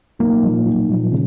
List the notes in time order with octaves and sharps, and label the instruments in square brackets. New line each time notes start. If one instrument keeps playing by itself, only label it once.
[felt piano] B1 [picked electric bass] A#3
[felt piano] A#2 F3
B1
A#2 F3
C#3